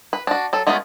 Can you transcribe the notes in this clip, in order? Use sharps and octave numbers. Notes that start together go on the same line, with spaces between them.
B4
D4 F#4
F#3 A4
G#3 A3 B3 C#4 F4